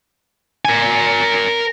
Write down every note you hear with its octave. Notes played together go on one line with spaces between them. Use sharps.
A#4 G#5